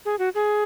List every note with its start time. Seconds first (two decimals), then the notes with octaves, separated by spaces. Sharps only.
0.05 G#4
0.19 F#4
0.35 G#4